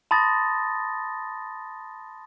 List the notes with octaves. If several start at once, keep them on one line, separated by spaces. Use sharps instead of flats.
A5 B5 C6 D#6 A6 A#6